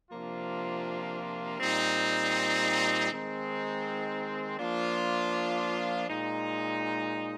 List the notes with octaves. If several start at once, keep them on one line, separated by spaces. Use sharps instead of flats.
C3 F3 A#3 D4 F4
A#2 G3 C4 D#4
D#3 G#3 C4 D#4
F3 A#3 D4 F4
A#2 G#3 D#4